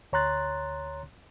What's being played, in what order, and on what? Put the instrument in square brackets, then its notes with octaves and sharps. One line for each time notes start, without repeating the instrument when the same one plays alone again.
[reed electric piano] D2 C#5 A#5 C6 F#6 A6